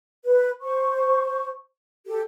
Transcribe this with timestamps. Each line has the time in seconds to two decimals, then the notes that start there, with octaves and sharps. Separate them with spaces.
0.24 B4
0.60 C5 C#6
2.06 G4 A4